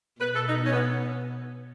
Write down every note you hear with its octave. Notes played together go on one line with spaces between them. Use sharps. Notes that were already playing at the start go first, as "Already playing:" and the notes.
B2 B4
A4
D#4
C#4
B3